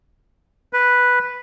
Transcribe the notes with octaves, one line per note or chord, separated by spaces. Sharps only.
B4